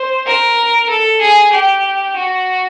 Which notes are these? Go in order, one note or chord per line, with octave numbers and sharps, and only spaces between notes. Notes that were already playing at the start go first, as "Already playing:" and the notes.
Already playing: C5
A#4
A4
G#4
G4
F#4